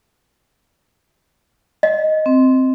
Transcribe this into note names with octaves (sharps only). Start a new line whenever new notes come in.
D#5
C4